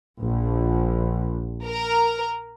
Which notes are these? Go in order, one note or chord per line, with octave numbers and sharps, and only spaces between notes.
A#1
A#4